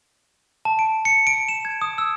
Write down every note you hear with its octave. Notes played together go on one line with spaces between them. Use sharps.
A5
D7
C#7
D7
E7
G#6
D#6
E6